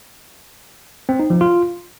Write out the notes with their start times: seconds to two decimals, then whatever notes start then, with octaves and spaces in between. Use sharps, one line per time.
1.09 C4
1.19 D#4
1.30 F3
1.41 F4